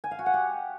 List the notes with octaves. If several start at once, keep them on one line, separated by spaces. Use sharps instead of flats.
G#5
F5
F#4
F#5
G4